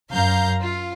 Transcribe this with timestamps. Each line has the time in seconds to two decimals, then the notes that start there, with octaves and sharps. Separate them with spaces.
0.10 F#2 F5 A#5 G6
0.60 F4